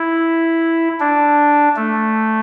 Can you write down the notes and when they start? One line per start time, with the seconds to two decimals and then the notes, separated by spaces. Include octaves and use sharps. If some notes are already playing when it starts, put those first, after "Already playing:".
Already playing: E4
1.00 D4
1.76 A3